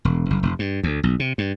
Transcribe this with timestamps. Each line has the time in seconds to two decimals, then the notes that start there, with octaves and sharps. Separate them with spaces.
0.05 E1
0.30 F#1
0.43 F1
0.59 G2
0.83 D2
1.03 B1
1.20 C3
1.38 G2